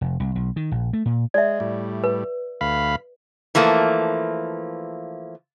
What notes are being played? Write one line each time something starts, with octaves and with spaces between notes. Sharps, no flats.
F1
C2
B1
D#3
A#1
A3
A#2
G#3 D5 E5
A2 G3
B4
D2 F5 B5
E3 F3 A3 A#3